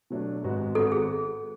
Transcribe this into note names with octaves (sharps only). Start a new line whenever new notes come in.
B2 F#3 A3 D4
G#1 G#2 G#3 B3 F#4
G#1 G#2 G#3 B3 F#4 A4
G#4